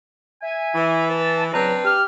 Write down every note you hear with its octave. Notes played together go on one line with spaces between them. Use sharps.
E5 G#5
E3
B4 A5
C#2 F#3 C4 D4 B4 A#5
G4 F6